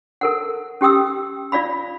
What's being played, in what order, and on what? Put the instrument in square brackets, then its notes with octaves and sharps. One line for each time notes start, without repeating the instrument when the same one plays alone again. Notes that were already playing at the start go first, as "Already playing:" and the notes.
[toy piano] A4 A#4 F#5
C#4 G4 G5 D#6 E6
F4 D5 F5 B5